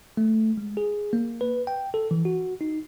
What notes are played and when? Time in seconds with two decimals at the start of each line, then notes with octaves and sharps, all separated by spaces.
0.17 A3
0.57 G#3
0.77 G#4
1.13 A#3
1.41 B4
1.67 G5
1.94 A4
2.11 E3
2.25 F#4
2.61 D#4